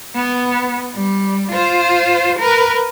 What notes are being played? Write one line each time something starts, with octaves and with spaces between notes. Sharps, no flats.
B3
G3
F4 C5
A#4 B4